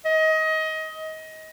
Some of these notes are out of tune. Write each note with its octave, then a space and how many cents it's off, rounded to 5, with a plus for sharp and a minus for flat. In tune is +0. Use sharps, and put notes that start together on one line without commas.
D#5 +25